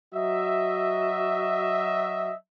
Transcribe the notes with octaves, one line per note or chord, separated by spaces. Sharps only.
F#3 F#4 D#5 E5